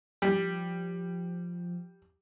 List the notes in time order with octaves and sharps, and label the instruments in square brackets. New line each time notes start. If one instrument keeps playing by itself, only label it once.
[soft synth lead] F3 [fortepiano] G3